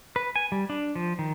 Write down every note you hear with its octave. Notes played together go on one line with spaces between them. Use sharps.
B4
G#5
G3
D4
F3
D#3